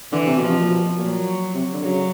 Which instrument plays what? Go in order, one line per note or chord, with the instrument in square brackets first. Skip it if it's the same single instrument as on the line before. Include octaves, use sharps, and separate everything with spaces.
[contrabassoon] D3 [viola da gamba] E3
[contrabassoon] C3
[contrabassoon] B2 [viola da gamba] F3
[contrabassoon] C3
A#2
B2
[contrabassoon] A#2 [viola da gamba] F#3
[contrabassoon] C3
D3
[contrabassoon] C#3 [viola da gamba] F#3